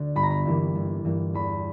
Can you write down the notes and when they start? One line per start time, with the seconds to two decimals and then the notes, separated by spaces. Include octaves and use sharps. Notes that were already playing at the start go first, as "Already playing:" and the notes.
Already playing: D2 D3
0.15 G1 B5
0.23 A#5
0.30 B5
0.45 G2 E3 A#3
0.75 G1
1.05 G2 E3 A#3
1.34 E2 B5